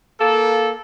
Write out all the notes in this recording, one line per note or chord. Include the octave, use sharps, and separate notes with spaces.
A#3 A4